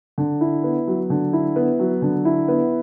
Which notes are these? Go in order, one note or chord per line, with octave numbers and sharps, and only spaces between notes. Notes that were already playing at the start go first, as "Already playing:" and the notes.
D3
E4
B3
F#3
D3
E4
B3
F#3
D3
E4
B3